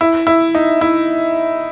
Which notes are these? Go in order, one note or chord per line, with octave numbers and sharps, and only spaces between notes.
E4
E4
D#4
E4